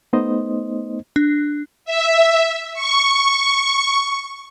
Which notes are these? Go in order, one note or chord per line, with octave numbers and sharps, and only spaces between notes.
A3 B3 D#4 C5 D#5
D4
E5
C#6